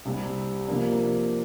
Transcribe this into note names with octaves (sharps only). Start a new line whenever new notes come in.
C2 C3 G3
C3 F3 A#3 D4